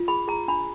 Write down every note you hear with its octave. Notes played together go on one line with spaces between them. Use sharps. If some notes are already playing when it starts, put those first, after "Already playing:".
Already playing: F4
G#4 B5
G#4 A#5
D4 B5